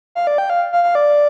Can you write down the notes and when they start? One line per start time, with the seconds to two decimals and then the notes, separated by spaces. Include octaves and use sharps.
0.15 F5
0.27 D5
0.38 G5
0.50 F5
0.73 F5
0.83 F5
0.95 D5